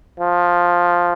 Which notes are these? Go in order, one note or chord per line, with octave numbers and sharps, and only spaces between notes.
F3